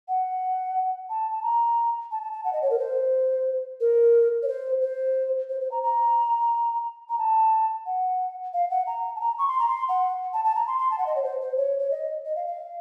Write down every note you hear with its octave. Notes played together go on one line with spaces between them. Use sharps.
F#5
A5
A5
A#5
A5
A5
A5
F#5
D#5
C#5
A#4
C5
A#4
C#5
C5
C5
C5
C5
A#5
A#5
A#5
A5
F#5
F5
F#5
A#5
A5
A#5
C#6
C6
A#5
C6
F#5
A5
A5
A#5
C6
C6
A5
F#5
D#5
C#5
C5
C5
C#5
C#5
D#5
D#5
F5
F5